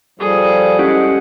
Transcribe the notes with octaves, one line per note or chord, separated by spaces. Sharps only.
F3 G3 G#4 A4
G#3 C#4 E4 G4 F#5